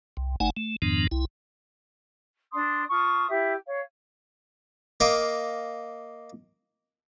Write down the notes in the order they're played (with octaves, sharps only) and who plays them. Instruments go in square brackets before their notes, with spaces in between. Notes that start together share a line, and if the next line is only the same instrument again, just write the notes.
[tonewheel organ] C2
G1 A3 D#4 F#5 G#5
A3
F2 G#2 D#3 F3 B3 D4
C2 E4
[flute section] D4 C6 D#6
F4 A5 C#6 D#6
E4 G4 E5
C#5 F5
[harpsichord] A#3 D#5 F5 D6